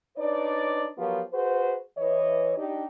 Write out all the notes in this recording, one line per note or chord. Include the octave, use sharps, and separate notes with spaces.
D4 D#4 B4 C#5 D5
F3 F#3 B3 F4 G4 A#4
F#4 G#4 B4 C5
E3 C#5 D#5
D4 D#4 G4